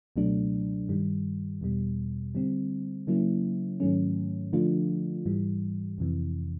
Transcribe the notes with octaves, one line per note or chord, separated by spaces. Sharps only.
C#2 B2 F#3 A3 D4
G2 D#3 G3
E2 B2 G3
D3 G3 C4
C#3 F#3 A#3 C#4 E4
G#2 D#3 F#3 A3 C#4
D3 F3 A3 D4 F4
G#2 E3 G3
F2 C3 E3